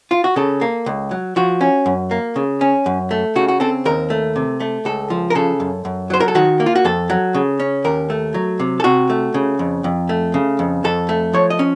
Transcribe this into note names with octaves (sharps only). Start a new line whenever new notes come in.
F4
F#4
C#3 A4
A#3
C#2
F#3
F3 F#4
C#4
F#2
A#3
C#3
C#4
F#2
A3
C#3 F#4
F#4
C4 A4
D#2 A#4
A3
C3
A3
C#2 A4
F3
A#4
C#3 A4
F#2
F#2
F#3 C5
A#4
A4
D#3 F#4
A#3
F4
F#4
F2 A4
F#3
C#3
C#4
D#2 A#4
A3
F#3
C3
A4
C3 F#4
A3
C#3
F2
F2
A3
C#3
F2
F2 A4
A3
F3 C#5
D#5
C#4